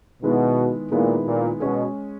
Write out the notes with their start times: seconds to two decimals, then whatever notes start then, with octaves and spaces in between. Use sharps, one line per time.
0.23 B2 D#3 G#3 B3 E4
0.91 A#2 D#3 G#3 B3 E4
1.25 A#2
1.60 B2 G#3 C#4 G#4